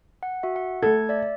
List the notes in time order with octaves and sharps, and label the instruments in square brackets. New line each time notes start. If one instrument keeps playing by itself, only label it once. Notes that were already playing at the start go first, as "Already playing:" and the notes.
[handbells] F#5
F#4 E5
F#5
[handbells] A3 G#6 [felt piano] A4
[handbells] D5 E5